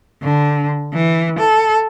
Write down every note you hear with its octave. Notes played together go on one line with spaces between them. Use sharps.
D3
E3
A4